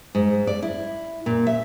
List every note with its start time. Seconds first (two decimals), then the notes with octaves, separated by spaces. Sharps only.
0.15 G#2
0.47 D5
0.62 E4
1.26 A#2
1.47 E5